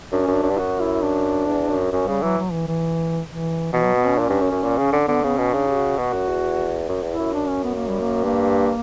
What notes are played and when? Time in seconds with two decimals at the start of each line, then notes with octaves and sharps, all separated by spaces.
0.12 F#2 D4
0.23 F#2 C#4
0.33 D4
0.42 F#2
0.50 G2
0.58 F#2 F#4
0.80 E4
1.02 D4
1.47 E2
1.70 F#2
1.92 F#2 C#4
2.07 C#3 G3
2.22 E3 F#3
2.38 F#3
2.52 E3
2.68 E3
3.28 E3
3.73 B2 E3
3.85 F#3
3.95 B3
4.07 C#4
4.16 A#2 D4
4.25 G2 C#4
4.41 F#2
4.52 F#2
4.63 A#2
4.78 C#3
4.92 D3
5.08 D3 B3
5.23 C#3 B3
5.38 B2 C#4
5.52 C#3 D4
5.68 G4
5.76 F#4
5.98 B2 F#4
6.13 F#2
6.29 E2
6.89 F#2
7.03 E2
7.11 E4
7.18 F#2
7.33 D4
7.48 C#4
7.64 B3
7.75 A#3
7.88 G3
8.01 A#3
8.24 G2 A#3